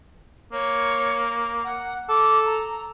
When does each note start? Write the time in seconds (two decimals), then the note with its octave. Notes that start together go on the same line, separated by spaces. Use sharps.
0.52 A#3 C#5
1.64 F#5
2.09 A4 D6
2.45 A#5